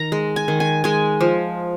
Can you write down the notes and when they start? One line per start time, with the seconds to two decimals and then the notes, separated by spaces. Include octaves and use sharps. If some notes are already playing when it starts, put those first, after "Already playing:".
Already playing: D#3 A#5
0.12 G#3
0.36 G#5
0.48 D#3
0.60 G#5
0.84 G#3 G#5
1.21 F3